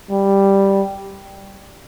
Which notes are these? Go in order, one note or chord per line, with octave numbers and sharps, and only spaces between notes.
G3